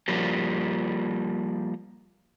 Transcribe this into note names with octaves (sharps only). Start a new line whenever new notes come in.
F3 G3 A#3